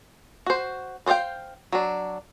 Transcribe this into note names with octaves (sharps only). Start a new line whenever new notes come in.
F#4 C5
B4 C5 D5 F5 G5
F#3 D4